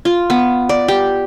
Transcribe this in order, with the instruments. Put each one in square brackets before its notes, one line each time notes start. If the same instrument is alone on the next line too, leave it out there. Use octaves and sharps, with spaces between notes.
[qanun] F4
B3
D5
G4